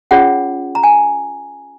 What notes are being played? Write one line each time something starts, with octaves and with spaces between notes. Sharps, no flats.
C#4 F4 G#4 C#5 F#5
A#5
G#5